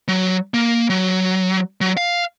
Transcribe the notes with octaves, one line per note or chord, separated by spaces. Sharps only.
F#3
A#3
F#3
F#3
F5